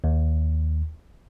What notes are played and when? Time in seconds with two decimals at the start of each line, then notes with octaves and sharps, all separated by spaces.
0.04 D#2